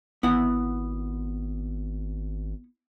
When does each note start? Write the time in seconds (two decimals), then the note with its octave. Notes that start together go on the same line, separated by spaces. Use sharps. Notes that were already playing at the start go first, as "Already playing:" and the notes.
0.23 G#1 B3 E4 F#5